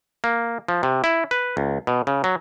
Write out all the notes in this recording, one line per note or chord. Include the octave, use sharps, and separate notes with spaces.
A#3
F3
C3
E4
B4
C#2
B2
C#3
F#3